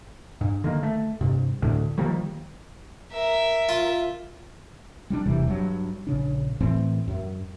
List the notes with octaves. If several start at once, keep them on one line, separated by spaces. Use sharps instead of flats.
G2
D3 D#3 A#3
A3
G2 C3
D2 A2 D3
D#3 F3 G3 A#3
A#4 E5
F4
G3 B3 D4
E1 C3 E3 G3
G2 F#3
A#1 C#3 D4
A2 E3 A3 C4
F#2